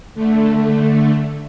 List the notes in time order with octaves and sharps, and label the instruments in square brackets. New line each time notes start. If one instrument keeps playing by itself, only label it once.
[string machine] D3 A3